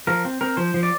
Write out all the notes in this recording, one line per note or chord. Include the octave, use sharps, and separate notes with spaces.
F3 A#4
C4
C4 A#4
F3 C5
F3
D5